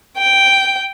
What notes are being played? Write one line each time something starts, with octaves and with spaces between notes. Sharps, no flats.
G5